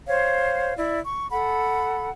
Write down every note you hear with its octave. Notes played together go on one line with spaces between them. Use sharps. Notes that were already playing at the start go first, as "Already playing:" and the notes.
C5 C#5 F5
E4 D5
C#6
A4 F#5 B5